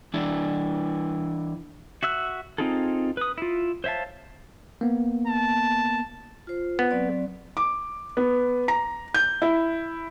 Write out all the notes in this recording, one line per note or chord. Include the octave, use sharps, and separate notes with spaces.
E3 D4 E4
F#4 E5 E6 F#6
C4 D#4 F4 G#4 A4
B4 D#6
E4 F4
C5 C#5 E5 F5 A5
A#3 B3
A5
F4 C5
B3
F#3 C4 D5
D6
B3
A#5
G6
E4